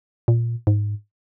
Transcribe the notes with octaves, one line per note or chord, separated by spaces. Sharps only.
A#2
G#2